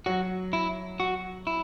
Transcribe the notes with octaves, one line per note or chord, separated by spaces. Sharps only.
F#3 F#4
E4
F#4
E4